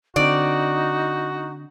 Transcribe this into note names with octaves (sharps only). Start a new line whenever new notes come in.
D3 C4 D#4 F#4 D5